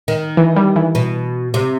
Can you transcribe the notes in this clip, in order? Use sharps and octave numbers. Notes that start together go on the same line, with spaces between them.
D#3
E3
G3
E3
B2
C3